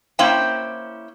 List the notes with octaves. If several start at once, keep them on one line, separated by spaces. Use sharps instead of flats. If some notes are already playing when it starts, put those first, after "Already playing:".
A#3 C#4 E4 C5 G5